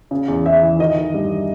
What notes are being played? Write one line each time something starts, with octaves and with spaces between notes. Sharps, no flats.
C#3
E2
E2 E5
E3
D#3 D#5
D#3
G2